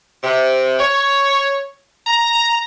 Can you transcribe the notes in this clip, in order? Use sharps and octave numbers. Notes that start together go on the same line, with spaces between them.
C3
C#5
A#5